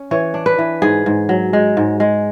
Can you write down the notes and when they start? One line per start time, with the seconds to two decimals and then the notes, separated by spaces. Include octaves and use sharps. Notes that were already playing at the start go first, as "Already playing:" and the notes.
Already playing: C#4
0.11 E3 C#5
0.34 D4
0.46 B4
0.59 E3
0.82 G#2 G#4
1.06 G#2
1.29 F#3
1.53 G#3
1.77 G#2
2.00 G#3